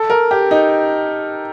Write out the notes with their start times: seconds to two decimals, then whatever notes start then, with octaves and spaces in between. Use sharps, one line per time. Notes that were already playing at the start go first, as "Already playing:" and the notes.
Already playing: A4
0.10 A#4
0.31 G4
0.51 D#4